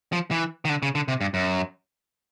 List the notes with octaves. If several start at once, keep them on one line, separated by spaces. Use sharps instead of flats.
F3
E3
D#3
D3
C#3
D3
C3
G2
F#2